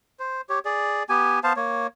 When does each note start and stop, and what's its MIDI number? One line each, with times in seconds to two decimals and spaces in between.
0.19 0.41 72
0.49 0.59 67
0.49 0.59 73
0.65 1.03 68
0.65 1.03 74
1.09 1.39 59
1.09 1.39 67
1.09 1.39 80
1.44 1.53 59
1.44 1.53 72
1.44 1.53 77
1.44 1.53 81
1.56 1.87 58
1.56 1.87 73